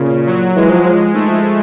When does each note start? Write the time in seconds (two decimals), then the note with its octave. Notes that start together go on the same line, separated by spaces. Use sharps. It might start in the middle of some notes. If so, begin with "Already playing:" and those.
Already playing: A#2 C#3
0.27 F#3
0.56 E3 G#3
0.70 F3
0.85 F3
0.99 F3
1.14 D#3 A3
1.28 F3
1.43 F3